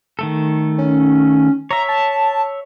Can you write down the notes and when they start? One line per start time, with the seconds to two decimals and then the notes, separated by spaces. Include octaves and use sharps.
0.19 D#3 A3 A4
0.78 C#4
1.71 C#5 E5 A#5
1.88 A5